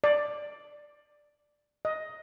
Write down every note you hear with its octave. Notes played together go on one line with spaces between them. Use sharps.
D5
D#5